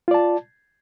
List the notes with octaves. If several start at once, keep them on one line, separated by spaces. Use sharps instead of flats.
F4 D5 A5